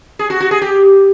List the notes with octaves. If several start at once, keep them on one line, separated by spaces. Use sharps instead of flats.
G#4
F#4
F#4
G#4
G4